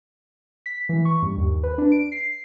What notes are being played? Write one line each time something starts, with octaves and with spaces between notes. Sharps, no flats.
B6
E3
C#6
G2
D#2
B4
D4
D7
C7